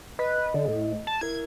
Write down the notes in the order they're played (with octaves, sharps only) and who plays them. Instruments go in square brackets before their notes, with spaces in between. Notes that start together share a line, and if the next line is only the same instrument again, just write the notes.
[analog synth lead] B4 [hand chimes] D#5
[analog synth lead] D3
A2
A5
[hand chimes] E4 A#4 [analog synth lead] G#6